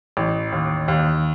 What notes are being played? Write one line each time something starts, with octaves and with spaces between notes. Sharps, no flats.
A1
D#2
D#2